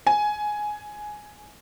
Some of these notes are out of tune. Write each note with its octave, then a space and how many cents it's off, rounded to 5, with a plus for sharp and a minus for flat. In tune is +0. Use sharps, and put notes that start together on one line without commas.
G#5 +10